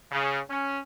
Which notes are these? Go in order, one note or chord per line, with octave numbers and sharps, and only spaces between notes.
C#3
C#4